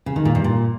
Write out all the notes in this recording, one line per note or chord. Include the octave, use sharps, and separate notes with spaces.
C#3
D#3
A#2
G2
A#2